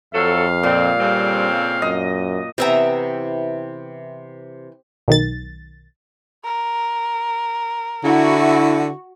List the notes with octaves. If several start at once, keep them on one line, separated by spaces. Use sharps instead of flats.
F2 F#3 A4 F5
A#2 C4
F2 C#3 G3 C4
F#2 D#5
C3 E3 B3 E5 G5 A#5
B1 D#3 A6
A#4
D3 E4 F#4